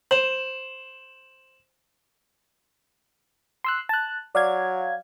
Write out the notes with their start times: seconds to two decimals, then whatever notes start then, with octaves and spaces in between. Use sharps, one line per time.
0.11 C5 E7 F#7
3.64 C6 E6 F#6
3.89 A5 F#6
4.35 F#3 D5 F5 G#6